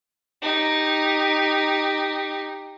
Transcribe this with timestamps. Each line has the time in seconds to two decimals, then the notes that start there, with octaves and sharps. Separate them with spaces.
0.42 D#4 G4